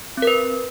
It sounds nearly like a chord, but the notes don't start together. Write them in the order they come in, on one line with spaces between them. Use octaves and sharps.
C4 A#4 B4